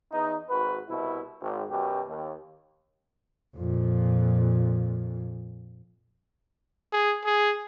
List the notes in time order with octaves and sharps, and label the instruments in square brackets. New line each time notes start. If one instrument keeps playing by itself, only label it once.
[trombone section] E2 D#4
G#1 F#4 B4
C2 B2 E4
G#1
F#2 B2 G4
D#2
[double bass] F2 A#2
[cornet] G#4
G#4